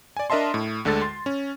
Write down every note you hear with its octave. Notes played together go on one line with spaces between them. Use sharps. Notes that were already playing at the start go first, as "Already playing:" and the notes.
D5 G#5
D4 A#4 D#5 E5 A5 C6
A2
D2 D3 G#3 A4 A6
C6
C#4